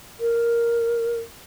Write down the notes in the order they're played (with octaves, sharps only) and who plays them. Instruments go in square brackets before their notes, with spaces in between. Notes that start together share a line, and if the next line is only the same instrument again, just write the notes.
[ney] A#4